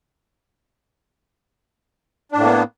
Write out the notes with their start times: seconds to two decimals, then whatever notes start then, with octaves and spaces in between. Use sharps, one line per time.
2.32 D4
2.36 A2
2.40 A#3
2.44 B3